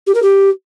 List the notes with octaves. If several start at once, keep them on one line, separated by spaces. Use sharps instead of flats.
G4
A#4
G4